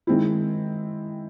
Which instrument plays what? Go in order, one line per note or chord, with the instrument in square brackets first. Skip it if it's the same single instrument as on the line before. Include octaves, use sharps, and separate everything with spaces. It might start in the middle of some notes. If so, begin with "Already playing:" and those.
[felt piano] D#3 G#3 C4 E4